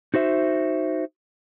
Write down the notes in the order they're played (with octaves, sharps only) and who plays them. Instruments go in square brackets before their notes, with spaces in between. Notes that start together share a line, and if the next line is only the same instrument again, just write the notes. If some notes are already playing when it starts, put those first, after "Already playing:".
[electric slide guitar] D#4 F#4 C5 E5